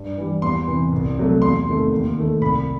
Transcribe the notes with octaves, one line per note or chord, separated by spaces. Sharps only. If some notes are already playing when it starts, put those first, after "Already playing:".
Already playing: G2
E3 G3
E2 C6
C3 E3
C2
C3 F#3 A3
E2 C6
C3 D#3 A3
D#2
D#3 A3
C2 B5